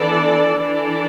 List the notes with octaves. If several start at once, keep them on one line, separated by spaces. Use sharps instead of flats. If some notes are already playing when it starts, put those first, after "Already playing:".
Already playing: E3 B3 D4 A4 D5
E3 D4 A4 D5